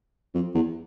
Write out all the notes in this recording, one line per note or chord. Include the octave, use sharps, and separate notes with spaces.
F2
E2